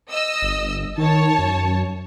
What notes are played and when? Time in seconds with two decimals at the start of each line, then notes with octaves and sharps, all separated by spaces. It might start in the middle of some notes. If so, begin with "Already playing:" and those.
0.11 D#5 E6
0.42 G1
0.98 D#3 C#5 A5
1.38 F#2